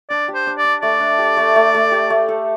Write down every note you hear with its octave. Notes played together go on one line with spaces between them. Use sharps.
D4 D5
G4
C5
D4
D5
D4
A3 D5
D4
G4
A3
A3
A3
G4
A3
A4